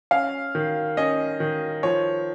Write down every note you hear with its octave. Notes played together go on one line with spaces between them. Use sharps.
C#4 F5
D#3
C#4 D#5
D#3
F3 C#5